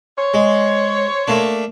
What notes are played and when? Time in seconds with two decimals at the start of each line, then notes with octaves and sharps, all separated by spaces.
0.18 C5 C#5
0.34 G#3
1.28 A3 A#3 D4